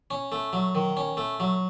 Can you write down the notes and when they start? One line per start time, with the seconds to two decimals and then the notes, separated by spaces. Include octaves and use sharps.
0.11 C#4
0.32 A3
0.53 F#3
0.75 D#3
0.97 C#4
1.17 A3
1.40 F#3